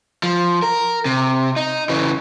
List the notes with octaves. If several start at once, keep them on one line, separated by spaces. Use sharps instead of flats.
F3
A#4
C3
D#4
C#3 E3